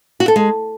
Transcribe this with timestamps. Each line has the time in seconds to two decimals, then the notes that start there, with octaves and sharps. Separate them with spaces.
0.20 F#4
0.28 A4
0.36 G#3